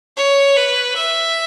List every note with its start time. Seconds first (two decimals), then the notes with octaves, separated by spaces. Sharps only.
0.17 C#5
0.57 B4
0.96 E5